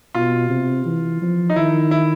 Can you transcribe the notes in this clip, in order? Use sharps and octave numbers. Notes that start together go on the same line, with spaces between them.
B2 F4
C3
E3
F3
D#4
D#3 E4
E4